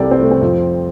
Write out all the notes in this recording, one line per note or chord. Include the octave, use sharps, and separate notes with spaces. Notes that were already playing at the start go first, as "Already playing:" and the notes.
Already playing: C2 C3 G3 A4 D5
C4
A3
C4
F2 F3